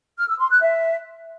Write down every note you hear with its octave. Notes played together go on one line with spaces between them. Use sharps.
F6
E6
C6
F#6
E5